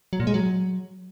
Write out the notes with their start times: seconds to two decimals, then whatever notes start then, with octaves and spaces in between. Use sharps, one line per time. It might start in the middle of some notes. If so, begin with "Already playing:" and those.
0.13 F#3
0.20 A#2
0.27 G#3
0.34 F#3